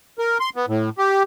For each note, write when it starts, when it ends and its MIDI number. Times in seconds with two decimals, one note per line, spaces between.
0.19 0.38 70
0.40 0.50 84
0.56 0.66 59
0.68 0.89 45
0.98 1.23 67